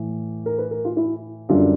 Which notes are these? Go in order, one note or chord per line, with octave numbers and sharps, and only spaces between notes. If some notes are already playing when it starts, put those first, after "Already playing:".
Already playing: A2 E3
A#4
B4
A#4
F4
E4
F#2 D3 G3 F4